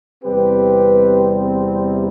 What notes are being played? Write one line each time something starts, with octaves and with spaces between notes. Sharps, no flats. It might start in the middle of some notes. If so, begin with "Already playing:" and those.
E2 C3 G3 C4 G4 B4